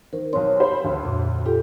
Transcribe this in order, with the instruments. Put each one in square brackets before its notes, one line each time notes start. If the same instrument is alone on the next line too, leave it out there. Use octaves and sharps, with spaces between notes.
[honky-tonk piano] D#3 [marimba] A#4 C5
[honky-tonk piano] B1 C4 [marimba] C#5 C6
[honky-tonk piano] C5 B5
D2
[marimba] F2 A#2
[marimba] F4 A4 [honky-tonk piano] G4